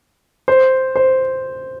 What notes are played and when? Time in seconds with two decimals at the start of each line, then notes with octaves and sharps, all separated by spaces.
0.48 C5
0.96 C5